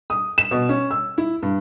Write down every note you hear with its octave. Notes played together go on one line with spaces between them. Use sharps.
D#6
E7
B2
C#4
E6
E4
G2